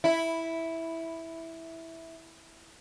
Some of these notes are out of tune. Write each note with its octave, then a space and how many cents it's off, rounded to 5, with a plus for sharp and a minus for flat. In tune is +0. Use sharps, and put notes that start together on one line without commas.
E4 -5